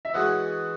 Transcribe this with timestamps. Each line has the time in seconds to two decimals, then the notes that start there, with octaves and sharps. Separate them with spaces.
0.05 E5
0.14 E3 G#3 C#4 F#4 G#4 F#5